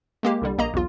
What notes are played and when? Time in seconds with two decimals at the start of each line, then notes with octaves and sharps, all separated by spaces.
0.23 G#3 A#3 G4
0.42 C2 D3 G3
0.58 A#1 A#3 D#5 A#5
0.74 B1 E2 F4